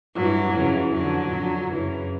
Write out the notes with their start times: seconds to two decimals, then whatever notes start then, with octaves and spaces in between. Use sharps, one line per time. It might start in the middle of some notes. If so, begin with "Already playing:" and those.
0.15 G2 E3 F#3
0.54 F2 C#3 E3
0.93 F2 D3 F#3
1.32 F2 D3
1.71 F#2 C#3 E3